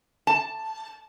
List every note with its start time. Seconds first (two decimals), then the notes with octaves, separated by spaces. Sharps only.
0.27 A5